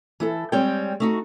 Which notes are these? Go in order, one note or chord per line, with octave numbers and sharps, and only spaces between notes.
E3 E4 A4
G3 G#3 C4 C#5 G5
A3 D#4 F#4